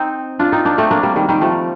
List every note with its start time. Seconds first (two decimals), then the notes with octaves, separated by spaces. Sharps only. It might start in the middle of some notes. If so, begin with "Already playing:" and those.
Already playing: C4 D#4
0.39 D4 F4
0.52 C4 D#4
0.65 A#3 D4
0.78 A3 C4
0.91 A#3 D4
1.03 G3 A#3
1.16 D#3 G3
1.29 D#3 G3
1.41 F3 A3